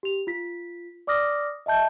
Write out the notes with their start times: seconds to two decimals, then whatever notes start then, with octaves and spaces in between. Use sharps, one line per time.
0.03 G4 F7
0.27 F4 B6
1.07 D5 D6 D#6 F6 A#6
1.66 D#5 E5 A5 G6